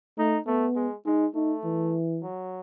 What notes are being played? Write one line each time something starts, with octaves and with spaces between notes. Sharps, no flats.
A3 D#4
A3 B3
G#3
G#3 D#4
A3 D#4
E3
F#3